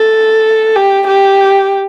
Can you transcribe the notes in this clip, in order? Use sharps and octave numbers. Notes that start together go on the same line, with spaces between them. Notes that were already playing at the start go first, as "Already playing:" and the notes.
Already playing: A4
G4
G4